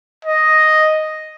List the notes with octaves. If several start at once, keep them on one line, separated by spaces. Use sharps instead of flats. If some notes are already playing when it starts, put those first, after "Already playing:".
D#5